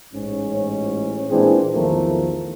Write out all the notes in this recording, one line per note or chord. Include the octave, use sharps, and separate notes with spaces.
A1 G#2 C#4
A#2 E3 G#3 C4 D4 G#4
B1 E2 D#3 F3 A3 A#4